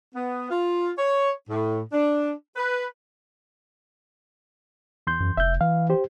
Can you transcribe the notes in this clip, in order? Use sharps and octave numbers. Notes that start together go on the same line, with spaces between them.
B3
F4
C#5
A2
D4
B4
E2 C6 G6
F#2
F1 E5 G6
E3 F5
G4 C5